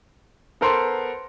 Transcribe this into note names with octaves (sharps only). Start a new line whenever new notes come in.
B3 A4 A#4 C5 C6